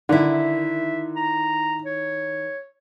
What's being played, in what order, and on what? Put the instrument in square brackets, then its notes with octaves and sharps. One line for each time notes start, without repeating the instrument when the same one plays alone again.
[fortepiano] D3 [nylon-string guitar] D#3 E4
[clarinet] E5
A#5
C#5